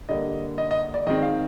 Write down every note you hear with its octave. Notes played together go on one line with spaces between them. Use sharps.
D3 G3 A#3 D#5
D#5
D#5
D5
D#3 G#3 C4 D#5
F5